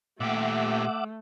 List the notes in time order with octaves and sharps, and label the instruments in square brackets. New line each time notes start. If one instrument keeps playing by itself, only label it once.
[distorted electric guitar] A#2 G4 [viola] A3 [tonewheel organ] E5 F#5 D6